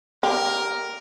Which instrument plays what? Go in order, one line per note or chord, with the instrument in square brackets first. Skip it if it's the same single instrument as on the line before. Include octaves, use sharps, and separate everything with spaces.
[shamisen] G4 [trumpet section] A#4